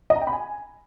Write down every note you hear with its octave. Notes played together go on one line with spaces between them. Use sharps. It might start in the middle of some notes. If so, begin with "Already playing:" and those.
D#5
A#5
G5
B5
G#5